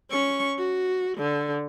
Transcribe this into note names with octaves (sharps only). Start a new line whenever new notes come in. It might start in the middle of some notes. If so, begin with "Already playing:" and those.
C#4 C#6
F#4
D3